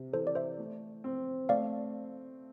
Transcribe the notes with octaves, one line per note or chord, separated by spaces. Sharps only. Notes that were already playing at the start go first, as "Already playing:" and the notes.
Already playing: C3
E3 A4 C5
D5
C5 E5
A3
C4
A3 D5 F5